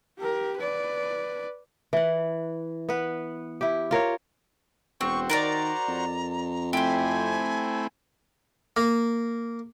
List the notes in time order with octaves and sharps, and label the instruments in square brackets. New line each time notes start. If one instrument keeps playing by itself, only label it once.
[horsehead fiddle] G4 A#4
B4 D5
[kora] E3 F#5
B3 B4
E4 G4
F4 A#4 C#5
[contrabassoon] E1 [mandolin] C4 [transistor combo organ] F#4 C5 [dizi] C#6
[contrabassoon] D#3 [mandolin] A#4 B4 D5 [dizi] A#5
[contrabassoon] F2
[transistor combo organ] A3 C4 E4 [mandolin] G4 C5 [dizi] G#5
[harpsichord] A#3